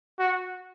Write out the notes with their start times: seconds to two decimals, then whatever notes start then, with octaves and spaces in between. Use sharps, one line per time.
0.19 F#4